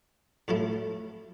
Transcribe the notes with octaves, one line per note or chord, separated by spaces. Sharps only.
A2 F#3 A3 E4 A4